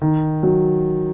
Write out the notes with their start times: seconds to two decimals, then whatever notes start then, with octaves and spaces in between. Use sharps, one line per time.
0.01 D#3
0.43 F#3